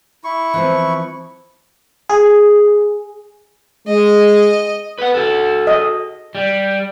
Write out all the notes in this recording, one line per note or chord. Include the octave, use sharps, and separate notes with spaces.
E4 C#6
E3 F3 C4
G#4
G#3 D#5
B4 F#5
F#4 A4
D#5
G3